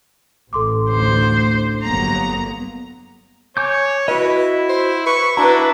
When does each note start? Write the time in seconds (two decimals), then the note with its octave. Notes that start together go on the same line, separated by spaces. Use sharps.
0.53 A1 A4 C6 D6
0.90 D2 C5
1.84 G1 F#3 A#3 B3 A#5
3.57 C#5 G#5 D6 G6
4.08 E4 F#4 B4 D#5
4.69 C5
5.06 B4 C#6
5.37 D4 E4 F#4 B4 A#5